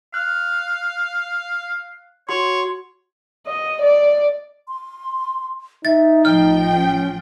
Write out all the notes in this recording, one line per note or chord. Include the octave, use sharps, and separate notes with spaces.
F5 F#6
F#4 C#5 C6
D#5
D5
C6
D#4 E5 A6
A1 F3 D#5 G5 F6
C#4